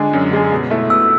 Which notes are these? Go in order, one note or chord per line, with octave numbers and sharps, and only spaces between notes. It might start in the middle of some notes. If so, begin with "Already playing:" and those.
Already playing: D3 G#3 D4 G#4
F#2
D3 G#3 D4 G#4
B2
A3 E4
B2 E6